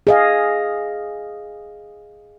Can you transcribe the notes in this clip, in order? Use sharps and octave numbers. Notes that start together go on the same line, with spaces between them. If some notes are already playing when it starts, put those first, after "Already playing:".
G#4 D#5 F5